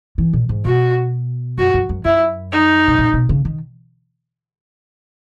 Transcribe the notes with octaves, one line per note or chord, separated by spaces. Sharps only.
E3
A#2
G#2
B2 F#4
F#2 F#4
F#2
F#2
F#2 E4
D#4
B2
A#2
B2
C#3
D#3